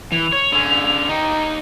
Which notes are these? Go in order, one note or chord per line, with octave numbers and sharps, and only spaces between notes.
E3 F7
C#5
D3 C#4
D#4 G4